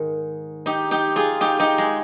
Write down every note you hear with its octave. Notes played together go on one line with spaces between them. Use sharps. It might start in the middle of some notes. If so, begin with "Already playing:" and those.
Already playing: G#2 D#3
D#4 G4
D#4 G4
F4 G#4
D#4 G4
D#4 G4
G#3